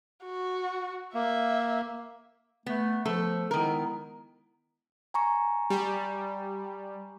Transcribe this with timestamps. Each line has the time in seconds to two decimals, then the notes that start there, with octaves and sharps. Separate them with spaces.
0.24 F#4
1.14 A#3 E5
2.66 A3 B3
3.05 F3 A3 A4
3.51 D#3 G#3 B3 E4 A#4
5.14 G#5 A#5 C#6
5.70 G3